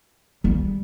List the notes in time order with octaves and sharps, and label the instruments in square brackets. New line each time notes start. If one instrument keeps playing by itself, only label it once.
[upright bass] G3